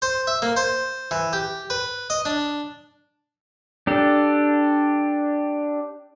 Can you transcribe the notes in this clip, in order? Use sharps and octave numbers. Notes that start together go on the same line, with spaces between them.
C5
E5
A#3
C5
E3
G4
B4
D#5
D4
D4 G4 A4